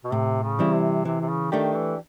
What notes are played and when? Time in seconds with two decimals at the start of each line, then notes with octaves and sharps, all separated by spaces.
0.04 B2
0.12 A2 C3
0.43 C#3
0.59 E3 G3 C4 E4
0.75 C3
1.05 C3 E3
1.21 C3
1.29 C#3
1.52 D#3 A3 D4 G4
1.75 E3